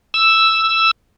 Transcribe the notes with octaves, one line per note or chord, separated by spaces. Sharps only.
E6